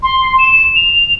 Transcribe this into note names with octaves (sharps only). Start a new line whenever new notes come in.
C6
E7
F7